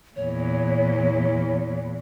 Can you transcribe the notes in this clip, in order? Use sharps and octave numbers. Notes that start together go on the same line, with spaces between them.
E2 A#2 C#5